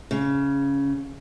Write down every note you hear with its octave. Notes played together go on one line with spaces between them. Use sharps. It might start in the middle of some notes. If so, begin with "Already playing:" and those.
C#3